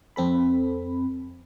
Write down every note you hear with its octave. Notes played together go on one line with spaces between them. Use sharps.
F2 C4 A4 B5